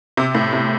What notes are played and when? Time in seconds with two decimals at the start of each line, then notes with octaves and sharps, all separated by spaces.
0.17 C3
0.35 A2
0.53 C3